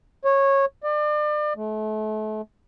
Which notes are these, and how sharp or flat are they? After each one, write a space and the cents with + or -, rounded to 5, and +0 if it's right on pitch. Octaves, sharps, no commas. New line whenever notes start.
C#5 -15
D5 +35
A3 -35